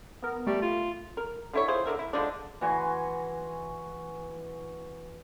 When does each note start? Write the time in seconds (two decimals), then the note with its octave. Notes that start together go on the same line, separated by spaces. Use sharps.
0.23 B3 A#4
0.47 G3 A3
0.62 F4
1.17 A#4
1.53 D3 E4 C#5
1.68 E4 F4 G#4 C5
1.85 D3 F#4 A#4 E5
1.99 E4
2.13 D3 F3 G#3 D4
2.61 E3 F#4 G#5 C6